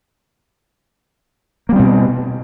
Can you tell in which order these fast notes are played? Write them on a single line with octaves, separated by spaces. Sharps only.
A#3 G3 C4 B2